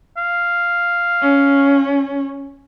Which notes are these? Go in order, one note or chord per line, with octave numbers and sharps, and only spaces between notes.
F5
C#4